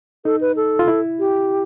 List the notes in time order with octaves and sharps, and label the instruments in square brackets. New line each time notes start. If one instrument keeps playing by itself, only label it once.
[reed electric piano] D#4 [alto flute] A4
[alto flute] B4
A4
[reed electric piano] F4
E4
[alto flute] G4